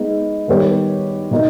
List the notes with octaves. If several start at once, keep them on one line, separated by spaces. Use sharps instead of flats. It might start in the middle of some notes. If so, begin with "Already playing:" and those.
Already playing: G#3 B3 D#4
D#3 G3 B3 G4 C#5
B2 A#3 D#4 A#4